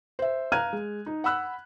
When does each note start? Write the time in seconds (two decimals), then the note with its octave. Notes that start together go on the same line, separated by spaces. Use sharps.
0.19 C5 E5
0.52 F5 A#5 F6 F#6 G#6 D#7
0.73 G#3
1.06 D#4
1.24 F#5 B5 E6 F#6